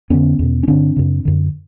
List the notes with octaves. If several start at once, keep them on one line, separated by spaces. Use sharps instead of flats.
F2 D3 B3 C#4
E2 B2
C#4
G2 D3 C4 D4
F#2 C#3
F#2 D3